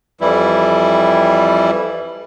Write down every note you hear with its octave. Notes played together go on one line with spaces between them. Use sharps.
F2 E3 G3 E4